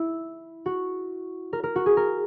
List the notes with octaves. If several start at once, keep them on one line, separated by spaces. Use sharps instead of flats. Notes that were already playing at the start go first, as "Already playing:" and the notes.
Already playing: E4
F#4
A#4
A#4
F#4
G#4
A#4